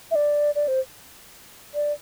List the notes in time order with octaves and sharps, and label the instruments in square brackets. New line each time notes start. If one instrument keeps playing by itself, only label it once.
[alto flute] E5
D5
D5
C5
D5